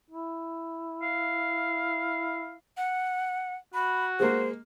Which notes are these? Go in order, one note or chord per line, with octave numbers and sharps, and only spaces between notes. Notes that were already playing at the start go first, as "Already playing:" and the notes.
E4
F5
F#5
F#4 B5
G#3 A#3 C5